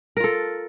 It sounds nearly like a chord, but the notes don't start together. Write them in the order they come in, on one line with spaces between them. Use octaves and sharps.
A#4 F4 A4